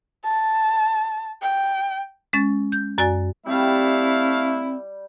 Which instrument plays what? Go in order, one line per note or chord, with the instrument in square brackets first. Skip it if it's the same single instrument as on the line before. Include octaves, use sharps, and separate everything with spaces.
[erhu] A5
G5
[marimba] G#3 C#4 A6
G6
F#2 F#4 D5 G#5 A6
[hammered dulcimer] G3 [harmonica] A3 F5 [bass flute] C4 [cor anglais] E4